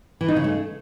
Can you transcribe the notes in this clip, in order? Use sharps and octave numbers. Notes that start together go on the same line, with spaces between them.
E3
D#4
C#3
A3